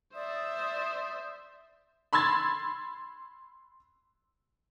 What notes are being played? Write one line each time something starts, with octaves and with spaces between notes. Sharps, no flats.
C5 D5 E5 D#6
B5 C6 E6 G#6 A6